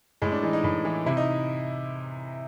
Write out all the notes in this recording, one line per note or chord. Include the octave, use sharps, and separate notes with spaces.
A2 G#3
D4
E3 D#4
D#4
A2
E3
C3 E4
D#4